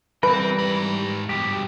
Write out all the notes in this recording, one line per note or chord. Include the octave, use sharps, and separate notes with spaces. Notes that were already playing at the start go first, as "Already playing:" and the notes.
E3 G3 C4 A#4 B4 G5
G#2 B5
G2 B2 G4